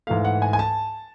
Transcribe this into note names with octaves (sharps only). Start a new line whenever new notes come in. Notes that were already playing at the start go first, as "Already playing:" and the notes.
G#2 E3 A3 F5
F#5
G#5
G#5
A5